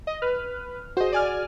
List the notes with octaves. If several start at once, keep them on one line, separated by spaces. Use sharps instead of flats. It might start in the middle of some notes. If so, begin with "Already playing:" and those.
D#5
B4 F6
F#4 G#4 C5 D#5
D5 G#5 F6